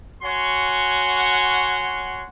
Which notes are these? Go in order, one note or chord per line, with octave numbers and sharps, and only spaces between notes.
F#4 C#5 F#5 G#5 C6